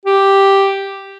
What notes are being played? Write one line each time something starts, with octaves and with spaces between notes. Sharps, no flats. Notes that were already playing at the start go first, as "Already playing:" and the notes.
G4